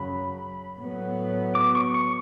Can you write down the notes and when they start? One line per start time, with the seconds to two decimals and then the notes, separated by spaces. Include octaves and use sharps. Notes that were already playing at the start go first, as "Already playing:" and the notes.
Already playing: F#2 C#3 F#3 B5
0.77 A2 F#3 B3
1.55 D6
1.75 C#6
1.94 C#6